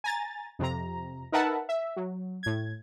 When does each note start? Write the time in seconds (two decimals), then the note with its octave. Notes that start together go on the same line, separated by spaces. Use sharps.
0.04 G#5 A#5 A6
0.59 F2 C3 A#5
1.32 D#4 A#4 B4 E5 F#5 A5
1.69 E5
1.96 F#3
2.43 A2 G#6